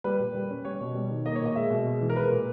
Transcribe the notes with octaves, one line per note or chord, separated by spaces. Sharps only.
G3 B4
A#2
G3
C#4
G3 C#5
B2
G3
D#3
A#3 D#5
C#5
A#2 D#5
G#3 E5
B2
G#3
E3
A#4
G#3 B4
A#2